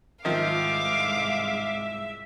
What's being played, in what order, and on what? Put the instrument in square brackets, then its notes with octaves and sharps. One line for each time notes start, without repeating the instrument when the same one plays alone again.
[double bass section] C2 G#2 G#3 [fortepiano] D#3 F3 [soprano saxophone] E5 [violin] F5 D6